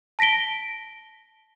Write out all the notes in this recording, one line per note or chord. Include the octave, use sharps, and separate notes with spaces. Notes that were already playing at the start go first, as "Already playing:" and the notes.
A5 A#6 B6 D7 G7